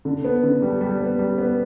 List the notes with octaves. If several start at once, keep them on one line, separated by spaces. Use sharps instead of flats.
D3
B3
D3
G3
G3
B3
G3
B3